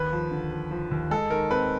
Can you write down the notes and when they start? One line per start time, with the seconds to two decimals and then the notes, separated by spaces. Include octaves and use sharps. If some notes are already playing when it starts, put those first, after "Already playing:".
Already playing: D#2 B4
0.12 F3
0.31 D3
0.52 F3
0.71 F3
0.91 D#2
1.11 G#3 A4
1.30 D#3 A#4
1.51 C4 B4